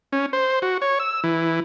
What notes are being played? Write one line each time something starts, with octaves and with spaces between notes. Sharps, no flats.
C#4
C5
F#4
C#5
E6
E3